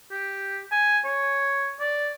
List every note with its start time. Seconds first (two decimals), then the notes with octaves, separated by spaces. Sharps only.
0.11 G4
0.72 G#5
1.05 C#5
1.80 D5